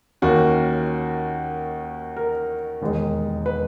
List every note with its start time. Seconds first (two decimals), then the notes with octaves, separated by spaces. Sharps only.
0.22 D#2 D#3 A#3 C#4 F#4
2.17 A#4
2.81 E1 D#2 D#3 G#3
3.46 B4